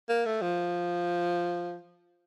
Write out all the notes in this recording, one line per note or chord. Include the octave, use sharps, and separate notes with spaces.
A#3
A3
F3